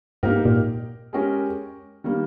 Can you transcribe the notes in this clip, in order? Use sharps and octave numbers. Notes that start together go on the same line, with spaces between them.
G#2 A#3 D#4 G4 A#4
A#2
G#3 C#4 G4 A#4
D#3 G3 A#3